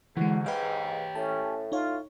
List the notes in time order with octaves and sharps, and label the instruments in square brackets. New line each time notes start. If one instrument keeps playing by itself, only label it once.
[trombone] G#2 [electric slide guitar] D3 [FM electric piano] E3 G#3 [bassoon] F#4
[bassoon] G#3 [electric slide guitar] G4 C#5 G5 [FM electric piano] B4 F5
[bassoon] A2 [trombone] C#4 [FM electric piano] A5
[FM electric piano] D#4 C#5 [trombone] F4